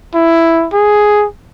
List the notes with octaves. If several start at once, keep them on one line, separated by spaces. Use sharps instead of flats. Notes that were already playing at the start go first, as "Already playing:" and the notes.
E4
G#4